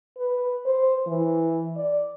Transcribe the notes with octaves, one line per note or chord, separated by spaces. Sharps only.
B4
C5
E3
D5